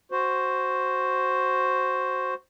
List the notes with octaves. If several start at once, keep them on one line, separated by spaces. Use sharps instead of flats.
F#4 C5